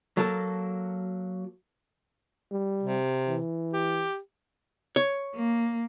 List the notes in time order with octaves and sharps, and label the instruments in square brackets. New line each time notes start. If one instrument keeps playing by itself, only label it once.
[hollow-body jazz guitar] F#3 A#3 A4
[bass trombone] G3
[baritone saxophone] C3
[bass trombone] E3
[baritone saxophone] G4
[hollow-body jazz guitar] C#5
[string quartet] A#3